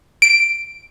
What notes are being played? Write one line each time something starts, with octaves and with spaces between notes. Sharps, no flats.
D7